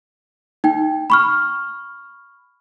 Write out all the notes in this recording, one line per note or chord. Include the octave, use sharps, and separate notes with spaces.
D#4 G5
B5 C#6 F6